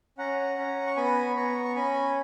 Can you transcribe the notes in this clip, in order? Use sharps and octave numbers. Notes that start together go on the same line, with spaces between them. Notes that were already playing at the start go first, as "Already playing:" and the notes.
C#4 F#5 A#5
C#4
C#6
B3 G#5 B5
B3 A#5 C#6
C#6
C#4 G#5 B5